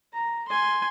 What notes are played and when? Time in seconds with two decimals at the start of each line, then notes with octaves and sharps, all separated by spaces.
0.13 A#5
0.48 G#5 C6